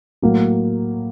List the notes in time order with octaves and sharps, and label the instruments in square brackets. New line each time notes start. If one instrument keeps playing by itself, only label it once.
[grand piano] A2 F#3 A#3